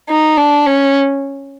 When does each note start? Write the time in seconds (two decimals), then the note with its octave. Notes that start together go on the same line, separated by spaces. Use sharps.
0.09 D#4
0.37 D4
0.66 C#4